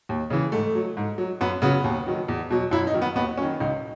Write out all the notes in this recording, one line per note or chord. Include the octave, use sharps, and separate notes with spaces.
D#2
C#3 E3
G#2 A3
F#3
G#2
F#3
F#2 B3
C#3 F#3 B3
D#2
D#3 F#3
E2
B2 F#3
F#2 E4
D#4
D#3 F#3
B3
D#2 B3
D#3 F#3 C#4
C#2 D#4